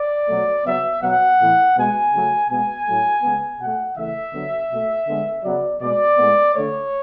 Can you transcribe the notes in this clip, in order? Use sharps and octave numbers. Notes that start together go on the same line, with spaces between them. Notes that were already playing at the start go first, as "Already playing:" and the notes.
Already playing: D5
B2 F#3 A3
C#3 F#3 B3 E5
B2 F#3 B3 F#5
A2 E3 B3
B2 G#3 B3 G#5
C#3 F#3 A3
B2 G#3 B3 G#5
A2 F#3 A3
C#3 G#3 B3
B2 A3 F#5
C#3 E3 A3 E5
D3 F#3 B3
B2 A3
D3 G#3 B3
C#3 F#3 B3 D5
B2 G#3 B3 D5
A2 G#3 B3
D3 A3 C#5